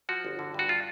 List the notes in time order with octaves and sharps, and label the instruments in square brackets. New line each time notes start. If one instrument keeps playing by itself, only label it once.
[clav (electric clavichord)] F3 F#4
G1
D3
G2 F#4
F4